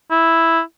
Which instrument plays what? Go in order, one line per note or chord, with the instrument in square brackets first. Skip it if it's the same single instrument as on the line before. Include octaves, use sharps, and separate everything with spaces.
[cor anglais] E4